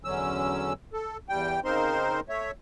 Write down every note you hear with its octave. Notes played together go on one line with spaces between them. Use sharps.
E2 D3 F#3 C#4 E6
A4
E2 G3 G5
C#3 C4 D#4 A#4 C5 C6
A3 C#5 E5